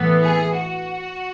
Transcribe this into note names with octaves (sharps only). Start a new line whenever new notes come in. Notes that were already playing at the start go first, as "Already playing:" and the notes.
Already playing: A2 E3 B3
G#4
F#4